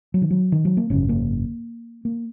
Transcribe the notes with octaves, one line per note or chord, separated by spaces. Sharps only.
F#3
D#3
F#3
D#3
F#3
A#3
G#1 F#2 C#3 C#4
A#3
A#3